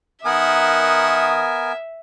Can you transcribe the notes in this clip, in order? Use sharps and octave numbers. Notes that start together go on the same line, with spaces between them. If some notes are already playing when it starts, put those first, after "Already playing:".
D#3 B3 A#4 E5 F#5 G#5 D#6